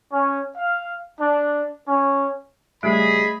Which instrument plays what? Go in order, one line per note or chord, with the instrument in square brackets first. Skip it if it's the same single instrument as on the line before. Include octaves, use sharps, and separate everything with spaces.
[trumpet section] C#4
F5
D4
C#4
[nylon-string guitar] C#3 G3 [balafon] A3 [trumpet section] G#4 D#5 [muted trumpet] B5